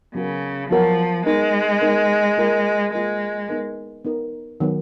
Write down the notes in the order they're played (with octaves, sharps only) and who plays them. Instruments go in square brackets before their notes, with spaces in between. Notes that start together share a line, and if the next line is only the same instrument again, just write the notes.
[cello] C#3 [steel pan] F#3 B3 F#4 A#4
[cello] F3 [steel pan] F#3 B3 F#4 A#4
[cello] G#3 [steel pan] B3 D#4 A#4
[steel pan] B3 D#4 A#4
A#3 F4 A#4
[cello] G#3 [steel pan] A#3 F4 A#4
[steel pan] B3 D#4 A#4
B3 D#4 A#4
D#3 F#3 B3